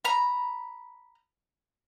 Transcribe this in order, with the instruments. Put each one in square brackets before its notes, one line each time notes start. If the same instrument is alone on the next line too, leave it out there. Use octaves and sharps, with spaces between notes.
[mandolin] A#5 B5